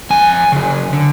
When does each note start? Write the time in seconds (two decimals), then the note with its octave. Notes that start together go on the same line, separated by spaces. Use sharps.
0.10 F2 G#5
0.52 C#3 F#3
0.93 D3